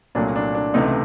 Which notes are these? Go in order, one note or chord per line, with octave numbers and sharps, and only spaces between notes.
C2 A#2 F#3 A3 D4
D4
D4
C#2 C3 E3 A3 D#4